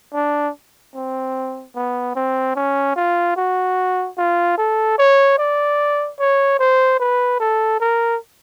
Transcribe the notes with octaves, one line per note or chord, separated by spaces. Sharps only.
D4
C4
B3
C4
C#4
F4
F#4
F4
A4
C#5
D5
C#5
C5
B4
A4
A#4